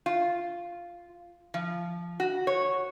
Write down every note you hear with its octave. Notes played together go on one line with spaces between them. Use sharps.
F4
F3
F#4
C#5